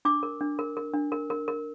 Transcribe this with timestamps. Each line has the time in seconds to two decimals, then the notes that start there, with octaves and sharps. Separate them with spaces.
0.05 D4 D6
0.23 A#4
0.41 D4
0.59 A#4
0.77 A#4
0.94 D4
1.12 A#4
1.30 A#4
1.48 A#4